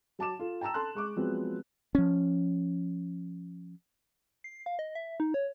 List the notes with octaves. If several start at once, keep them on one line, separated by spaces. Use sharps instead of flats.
F#3 A5 D6 E7
F4 A4
G5 A5 A#5 E6 E7
A4 A5 C6 F#6
G#3 C#6 D6
F3 F#3 G#3 B3 C4
F3 C#4
C7
F5
D#5
E5
D#4
C#5